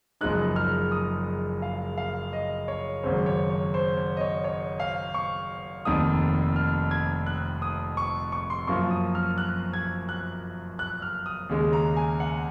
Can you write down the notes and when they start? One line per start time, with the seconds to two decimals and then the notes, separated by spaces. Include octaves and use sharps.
0.21 F#1 F#2 F3 G#3 D#4 F#6
0.56 F6
0.92 D#6
1.62 F5
1.97 F5
2.33 D#5
2.68 C#5
3.03 G#1 F#2 C#3 C5
3.26 C#5
3.50 C#5
3.74 C5
3.97 C#5
4.17 D#5
4.21 C#5
4.44 C#5
4.80 F5
5.14 C#6
5.85 F1 F2 D#3 A#3 D#6
6.56 F6
6.91 G#6
7.26 F#6
7.62 D#6
7.97 C#6
8.32 C#6
8.50 C6
8.67 F#2 F3 A#3 F4 C#6
8.91 D#6
9.15 F6
9.38 F#6
9.73 G#6
10.09 F#6
10.79 F#6
11.02 F6
11.26 D#6
11.49 D#2 C#3 G#3
11.73 A#5
11.96 G#5
12.20 F#5